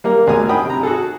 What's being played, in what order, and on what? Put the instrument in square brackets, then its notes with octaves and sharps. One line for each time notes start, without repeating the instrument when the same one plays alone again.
[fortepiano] G3 A#3 A#4
D2 B2 G#4 A#4 G#5
G5 G#5 B5 D#6
C3 A#5
F#4 G#4 A4